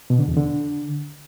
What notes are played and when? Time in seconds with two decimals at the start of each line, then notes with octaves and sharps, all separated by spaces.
0.10 B2
0.19 D3
0.28 E2
0.36 D3